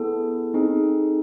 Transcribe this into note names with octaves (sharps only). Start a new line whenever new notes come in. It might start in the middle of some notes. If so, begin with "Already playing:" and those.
Already playing: B3 E4 G#4 A4
C4 D#4 G#4